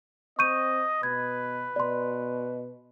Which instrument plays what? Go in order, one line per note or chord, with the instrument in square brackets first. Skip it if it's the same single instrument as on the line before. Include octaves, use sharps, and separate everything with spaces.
[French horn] C4 [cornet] D#5 [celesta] C#6 G6 D#7
[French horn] B2 [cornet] B4 [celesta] G#6
[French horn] B2 [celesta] D5 C6